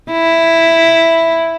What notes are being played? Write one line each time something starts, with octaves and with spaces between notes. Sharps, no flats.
E4